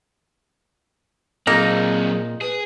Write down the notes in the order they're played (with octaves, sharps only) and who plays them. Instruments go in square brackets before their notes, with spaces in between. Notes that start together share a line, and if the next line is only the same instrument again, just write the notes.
[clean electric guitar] A#2 A#4 A#5 [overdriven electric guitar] F#3 C4 [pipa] A#3 D#4 [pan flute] G#4
[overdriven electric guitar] G#4 [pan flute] B4